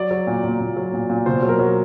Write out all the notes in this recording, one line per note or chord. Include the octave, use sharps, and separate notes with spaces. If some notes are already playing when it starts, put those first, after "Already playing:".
Already playing: F#3 D5
F#3
A#2
A#2
A#2
F#3
A#2
A#2
B2 C5
F#3
A#4
F#3